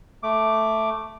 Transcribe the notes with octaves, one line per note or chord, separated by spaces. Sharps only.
A3 D6